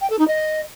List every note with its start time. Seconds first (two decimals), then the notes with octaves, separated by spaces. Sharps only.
0.01 G5
0.10 A4
0.19 D#4
0.28 D#5